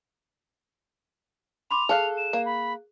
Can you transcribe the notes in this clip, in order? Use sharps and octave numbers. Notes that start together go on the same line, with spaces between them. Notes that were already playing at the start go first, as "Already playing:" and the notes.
B5 C6 D6 F7
G#4 A4 F5 F#6
E7
A#3
B5